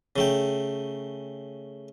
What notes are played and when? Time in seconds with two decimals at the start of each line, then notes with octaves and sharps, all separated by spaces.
0.16 C#3 A3 G5